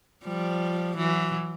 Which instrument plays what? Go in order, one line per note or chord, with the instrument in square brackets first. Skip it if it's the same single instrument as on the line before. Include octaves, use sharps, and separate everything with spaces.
[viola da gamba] F3 G3
E3 F#3